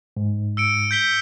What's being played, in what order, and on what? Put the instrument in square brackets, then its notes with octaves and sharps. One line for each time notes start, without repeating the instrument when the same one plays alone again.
[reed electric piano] G#2
[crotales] E6 C#7 D7
G6 B6 G7